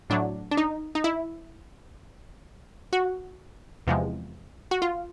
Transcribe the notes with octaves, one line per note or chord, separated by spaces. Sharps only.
A2 F#3 D4
D4
D#4
D#4
E4
F#4
E2 C3 F3 G#3
F#4
F4